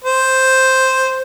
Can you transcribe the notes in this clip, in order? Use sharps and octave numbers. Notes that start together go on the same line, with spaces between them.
C5